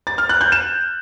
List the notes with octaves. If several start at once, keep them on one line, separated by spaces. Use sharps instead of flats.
A6
F6
F#6
G6
E7